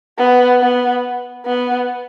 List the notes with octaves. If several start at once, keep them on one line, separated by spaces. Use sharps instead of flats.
B3
B3
B3